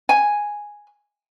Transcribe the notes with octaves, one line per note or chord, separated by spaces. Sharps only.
G#5